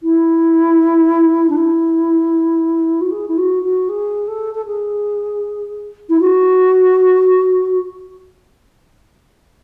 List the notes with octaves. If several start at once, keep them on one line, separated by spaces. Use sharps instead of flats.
E4
D4
E4
F#4
G#4
E4
F#4
F#4
G#4
A4
A4
G#4
E4
F#4